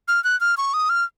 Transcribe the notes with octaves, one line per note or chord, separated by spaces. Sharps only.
F6
F#6
F6
C#6
D#6
F6